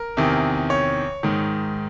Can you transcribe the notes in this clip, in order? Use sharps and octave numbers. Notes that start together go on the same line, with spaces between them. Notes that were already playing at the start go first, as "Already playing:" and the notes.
Already playing: A#4
E2 C3 D#3
C#5
G#2 D#3